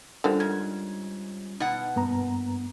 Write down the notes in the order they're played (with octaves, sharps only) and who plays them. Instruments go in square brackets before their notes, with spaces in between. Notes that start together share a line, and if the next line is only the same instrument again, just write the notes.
[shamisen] D3 D#3 F3 [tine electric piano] G3 C#4 F4
[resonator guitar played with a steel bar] G#2 [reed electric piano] G#6
[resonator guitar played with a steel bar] B2 F#5 [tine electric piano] D#4
[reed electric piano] G2 B3 A#5 [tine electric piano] A#3